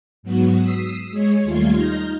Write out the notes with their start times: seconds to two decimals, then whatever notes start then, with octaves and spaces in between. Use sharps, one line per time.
0.23 G#2 F#3 B3 F#4
0.57 D#6 E6 B6 C7
1.11 G#3 C#5
1.43 D#2 G3 A3 F4 C6 G#6
1.74 D#4 F6 G6 A#6